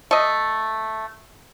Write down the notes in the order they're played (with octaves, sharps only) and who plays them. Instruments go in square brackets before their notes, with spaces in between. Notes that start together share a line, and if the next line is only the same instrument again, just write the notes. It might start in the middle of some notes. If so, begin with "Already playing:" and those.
[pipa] A3 D#5